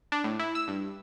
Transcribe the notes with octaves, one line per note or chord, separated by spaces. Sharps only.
D4
A2
E4
E6
G2